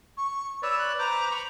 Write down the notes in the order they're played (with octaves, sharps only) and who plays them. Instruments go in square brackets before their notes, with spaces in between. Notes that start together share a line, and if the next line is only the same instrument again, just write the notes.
[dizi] C#6
[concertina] B4 C#5 D5 [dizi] E6
[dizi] F#6
[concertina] B4 C5 D6 [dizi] A#5
[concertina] B5 C#6